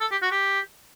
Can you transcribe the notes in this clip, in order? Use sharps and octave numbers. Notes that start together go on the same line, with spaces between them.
A4
G4
F#4
G4